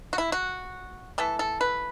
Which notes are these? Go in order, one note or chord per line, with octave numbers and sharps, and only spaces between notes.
F#4
E4
F#4
E3 A3 A4
A4
B4